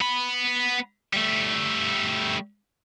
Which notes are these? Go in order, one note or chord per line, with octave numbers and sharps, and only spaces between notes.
B3 B5
G3 A3